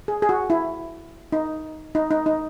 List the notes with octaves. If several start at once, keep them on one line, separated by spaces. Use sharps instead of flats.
G#4
G#4
F#4
E4
D#4
D#4
D#4
D#4